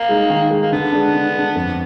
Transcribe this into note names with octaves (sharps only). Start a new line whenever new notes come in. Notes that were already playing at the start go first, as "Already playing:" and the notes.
Already playing: A#3
G#3 D#4
D#3
G#3 D#4
A#3
D3 B3
G#3 D4
D3
G#3 D4
F2